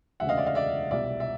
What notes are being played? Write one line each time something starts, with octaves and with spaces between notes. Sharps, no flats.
E1 D2 C#3 E5 F#5
D#5 F5
D5 E5
D#5 F5
D5 E5
C2 B2 G3 D5 E5
E5